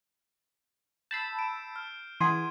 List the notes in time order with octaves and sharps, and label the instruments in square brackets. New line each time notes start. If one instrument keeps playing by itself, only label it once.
[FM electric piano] A5 B5 E6 [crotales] G6 C7
[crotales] D7 E7
F6
[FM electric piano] E3 G#4 [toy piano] F#5 C6 [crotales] G#6 C7 D#7